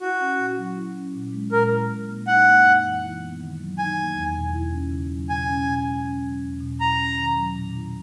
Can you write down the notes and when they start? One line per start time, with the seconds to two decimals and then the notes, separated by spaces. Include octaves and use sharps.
0.01 E4 F#4
0.20 C#4
0.38 A#2
0.57 F#3
0.76 E4
0.96 C#4
1.15 A#2
1.33 G#3
1.52 A#2 A#4
1.71 E4
1.90 A#2
2.09 A#3
2.27 D#4 F#5
2.46 A#3
2.65 F#2
2.84 E3
3.03 E4
3.22 B3
3.41 D#3
3.59 F#3
3.78 D#4 G#5
3.97 A#3
4.16 E2
4.35 B2
4.54 E4
4.72 C#4
4.91 C#3
5.10 F#3
5.29 B2 G#5
5.48 C#4
5.67 B2
5.86 G#3
6.05 C#4
6.23 F#3
6.42 E2
6.60 B2
6.80 E4 A#5
6.98 C#4
7.18 D#3
7.36 F#3
7.55 A#2
7.75 E4